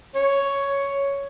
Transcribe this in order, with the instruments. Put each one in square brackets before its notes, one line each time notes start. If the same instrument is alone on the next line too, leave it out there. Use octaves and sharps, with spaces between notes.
[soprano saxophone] C#5